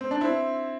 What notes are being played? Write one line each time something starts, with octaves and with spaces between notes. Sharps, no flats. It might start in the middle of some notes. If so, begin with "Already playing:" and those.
C4
D4
C4 E4